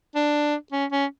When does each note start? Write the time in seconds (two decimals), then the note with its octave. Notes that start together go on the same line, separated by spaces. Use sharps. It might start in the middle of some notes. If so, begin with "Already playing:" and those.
0.15 D4
0.72 C#4
0.92 C#4